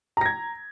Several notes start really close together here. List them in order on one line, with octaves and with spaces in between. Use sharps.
A#5 A#6 G#6